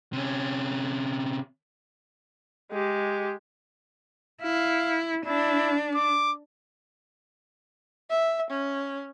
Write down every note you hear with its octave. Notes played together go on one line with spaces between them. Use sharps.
C3 C#4
G#3 G4
E4 F5
D4 E4
D6
E5
C#4